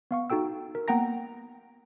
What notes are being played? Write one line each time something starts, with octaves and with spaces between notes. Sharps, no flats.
B3 F5 C#6
D#4 F#4 A4 G5 E6
A#4
A#3 B3 F#5 G5 A#5 A#6